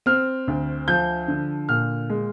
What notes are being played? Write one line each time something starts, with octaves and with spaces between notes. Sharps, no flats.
C4 F6
D2
F3 G6
D3
A#2 F6
G#3